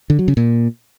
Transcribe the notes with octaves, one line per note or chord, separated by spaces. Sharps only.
D3
F#3
C#3
A#2